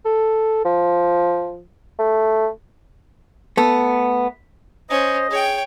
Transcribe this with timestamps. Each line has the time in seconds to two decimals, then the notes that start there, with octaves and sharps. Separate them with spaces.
0.05 A4
0.65 F3
1.99 A3
3.57 A3 B3
4.90 C#4 C5 D#5
5.31 G#4 C#5 G5